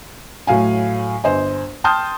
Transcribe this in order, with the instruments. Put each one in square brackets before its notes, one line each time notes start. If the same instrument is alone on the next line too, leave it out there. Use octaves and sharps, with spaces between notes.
[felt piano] A2 F#3 F5 G#5
G1 C5 D#5 G#5
G5 A5 C6 D#6 F6 G6